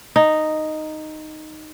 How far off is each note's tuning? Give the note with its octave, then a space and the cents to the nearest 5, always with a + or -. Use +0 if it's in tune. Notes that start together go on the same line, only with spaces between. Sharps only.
D#4 -5